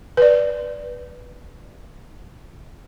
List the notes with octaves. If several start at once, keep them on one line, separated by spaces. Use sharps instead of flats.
B4 D5